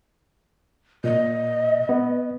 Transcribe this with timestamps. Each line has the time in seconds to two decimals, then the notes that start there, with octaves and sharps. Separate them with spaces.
1.04 A#2 D#5
1.89 B3